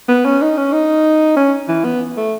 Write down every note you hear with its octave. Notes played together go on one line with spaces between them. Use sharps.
B3
C#4
D#4
C#4
D#4
C#4
E3
B3
A3